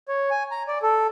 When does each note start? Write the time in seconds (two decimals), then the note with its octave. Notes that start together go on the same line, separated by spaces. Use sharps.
0.08 C#5
0.31 G#5
0.51 A#5
0.68 D5
0.83 A4